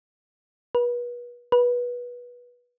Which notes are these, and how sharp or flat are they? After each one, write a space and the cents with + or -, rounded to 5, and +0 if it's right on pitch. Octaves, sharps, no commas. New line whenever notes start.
B4 -35
B4 -20